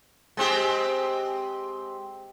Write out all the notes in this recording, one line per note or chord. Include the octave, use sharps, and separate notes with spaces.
G#3 C4 G4